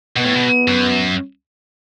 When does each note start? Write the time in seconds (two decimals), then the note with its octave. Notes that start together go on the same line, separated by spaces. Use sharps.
0.17 B2 B3
0.26 A2
0.35 B2
0.68 F#2